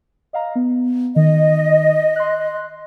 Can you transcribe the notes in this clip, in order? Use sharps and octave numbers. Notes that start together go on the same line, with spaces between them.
D#5 F5 A#5
B3
D#3 D#5
C6 F#6